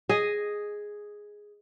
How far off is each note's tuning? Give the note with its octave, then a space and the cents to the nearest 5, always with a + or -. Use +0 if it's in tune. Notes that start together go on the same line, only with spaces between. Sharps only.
G#4 +0 D#5 +0